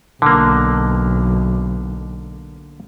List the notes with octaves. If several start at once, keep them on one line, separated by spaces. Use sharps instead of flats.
B1 D3 A#3